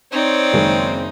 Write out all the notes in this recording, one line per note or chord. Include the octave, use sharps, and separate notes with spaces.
C4 D#4 C#5 D5
F#1 D#3 G#3